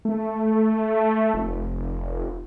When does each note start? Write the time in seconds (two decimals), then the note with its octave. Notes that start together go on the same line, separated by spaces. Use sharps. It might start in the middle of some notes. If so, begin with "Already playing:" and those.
0.05 A3
1.34 F1